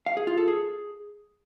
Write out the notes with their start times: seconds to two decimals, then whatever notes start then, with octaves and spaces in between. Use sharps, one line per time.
0.06 F5
0.17 G#4
0.27 F4
0.37 A4
0.48 G#4